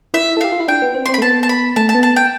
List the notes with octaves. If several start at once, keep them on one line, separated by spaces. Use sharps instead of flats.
E4 E5
A4
G4 F5
F4
E4
D4 G5
B3
C4
C6
C4
B5
A3
B3 A5
A5
B5
A3 A5
A5
B3
A5
G5